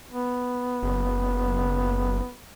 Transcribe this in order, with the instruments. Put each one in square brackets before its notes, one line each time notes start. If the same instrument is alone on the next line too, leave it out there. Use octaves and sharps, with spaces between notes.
[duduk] B3
[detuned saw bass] F#1